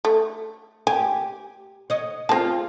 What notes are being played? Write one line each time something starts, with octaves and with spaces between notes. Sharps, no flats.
A3
G4 G#5
C#5 D#5
C4 F4 G#4 A5